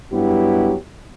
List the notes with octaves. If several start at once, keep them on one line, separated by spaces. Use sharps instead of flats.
G2 F#3 B3 E4 G4